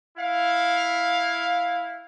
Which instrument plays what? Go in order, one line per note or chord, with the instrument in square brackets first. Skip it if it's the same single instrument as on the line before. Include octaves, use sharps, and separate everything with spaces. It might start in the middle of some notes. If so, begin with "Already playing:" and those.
[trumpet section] E4 F5